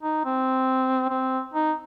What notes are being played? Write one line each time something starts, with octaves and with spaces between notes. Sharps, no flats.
D#4
C4
C4
D#4